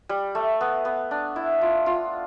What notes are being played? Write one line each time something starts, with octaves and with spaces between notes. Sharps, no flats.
G3
A3
B3
B3
D4
E4
F4
F4